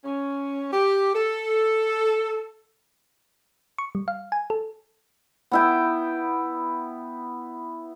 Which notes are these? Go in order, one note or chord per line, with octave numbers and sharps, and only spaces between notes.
C#4
G4
A4
C#6
G3
F5
G#5
A4
B3 E4 G5